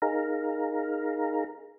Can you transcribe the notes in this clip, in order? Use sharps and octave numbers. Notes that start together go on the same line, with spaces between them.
D#4 G#4 A#4 F5 A#5